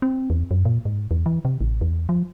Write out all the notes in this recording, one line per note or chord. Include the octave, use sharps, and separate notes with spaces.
C4
E2
F#2
A#2
G#2
E2
E3
C3
A1
E2
F3